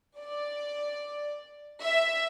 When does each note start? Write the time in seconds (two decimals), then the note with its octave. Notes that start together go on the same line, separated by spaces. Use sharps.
0.19 D5
1.82 E5